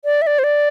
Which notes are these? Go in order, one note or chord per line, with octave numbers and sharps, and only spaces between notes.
D5
E5
D5
C5
D5